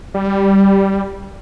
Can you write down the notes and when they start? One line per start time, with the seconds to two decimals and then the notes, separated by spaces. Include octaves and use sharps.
0.14 G3